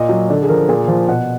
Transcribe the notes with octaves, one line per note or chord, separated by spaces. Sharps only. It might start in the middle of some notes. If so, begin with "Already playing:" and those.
Already playing: A#2 D#5
F#3
D3 D5
G#4
F3 A#4
A#2 G#4
F3
B2 F#5